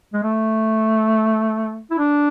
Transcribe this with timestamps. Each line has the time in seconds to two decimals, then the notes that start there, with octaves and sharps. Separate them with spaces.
0.14 G#3
0.24 A3
1.91 E4
1.99 D4